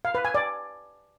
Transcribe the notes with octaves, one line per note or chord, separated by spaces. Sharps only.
F5
B4
G#5
D5